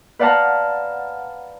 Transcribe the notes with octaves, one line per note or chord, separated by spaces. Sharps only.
B4 D5 F5 F#5 A5 A#5